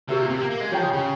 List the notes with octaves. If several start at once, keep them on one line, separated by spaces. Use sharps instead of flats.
C3 G4 A#4 E5
A#2
C3
A#3
A#3
G#3
F3 G4 C#5 G5 A#5
C#3
C#3